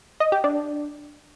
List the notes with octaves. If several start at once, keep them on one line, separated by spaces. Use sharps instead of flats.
D#5
G4
D4